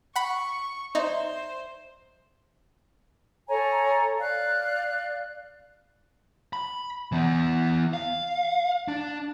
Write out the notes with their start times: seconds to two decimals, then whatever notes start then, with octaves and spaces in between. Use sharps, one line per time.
0.16 F#5 B5 C#6
0.95 D#4 C5 D5 E5 C6
3.48 A4 C#5 G#5 A#5
4.20 D5 F5 F#6
6.53 B5
7.12 E3 B3
7.93 F5
8.88 D4